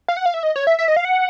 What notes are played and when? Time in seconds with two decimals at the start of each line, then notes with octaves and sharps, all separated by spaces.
0.08 F5
0.17 F#5
0.26 F5
0.34 E5
0.43 D#5
0.56 C#5
0.67 E5
0.79 E5
0.88 D#5
0.96 F5
1.05 F#5